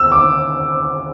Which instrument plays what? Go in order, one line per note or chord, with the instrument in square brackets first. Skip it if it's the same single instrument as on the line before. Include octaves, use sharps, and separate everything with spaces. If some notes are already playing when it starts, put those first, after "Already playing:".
Already playing: [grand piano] E6
D6